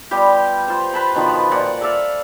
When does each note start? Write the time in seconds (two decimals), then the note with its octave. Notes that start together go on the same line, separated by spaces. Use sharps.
0.11 G3 B3 F4 G4
0.68 F4 C5
0.93 B4 A5 B5 C6
1.15 B2 D#3 F3 B3
1.51 A#2 D5 F#5
1.81 A4 D5 E5 F5